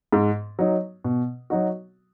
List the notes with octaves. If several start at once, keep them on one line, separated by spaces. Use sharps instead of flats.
G#2
F#3 D#4
B2
F#3 D#4 F#4